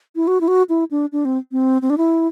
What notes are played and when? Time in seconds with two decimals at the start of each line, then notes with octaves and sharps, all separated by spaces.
0.16 E4
0.27 F#4
0.41 E4
0.48 F#4
0.69 E4
0.91 D4
1.12 D4
1.25 C4
1.52 C4
1.82 C4
1.90 D4
1.98 E4